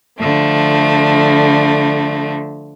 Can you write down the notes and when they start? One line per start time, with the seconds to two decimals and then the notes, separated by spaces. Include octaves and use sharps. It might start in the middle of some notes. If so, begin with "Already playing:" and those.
0.19 D3 F3 A3